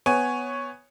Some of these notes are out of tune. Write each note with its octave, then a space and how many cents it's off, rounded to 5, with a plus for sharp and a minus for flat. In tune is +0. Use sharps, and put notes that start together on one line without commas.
B3 +5 C#5 +0 G#5 +0